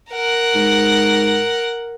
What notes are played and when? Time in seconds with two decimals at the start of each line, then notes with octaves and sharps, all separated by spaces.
0.11 A#4 F#5
0.55 G#2